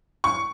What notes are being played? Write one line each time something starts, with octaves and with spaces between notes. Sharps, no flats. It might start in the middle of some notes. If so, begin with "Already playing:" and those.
C#6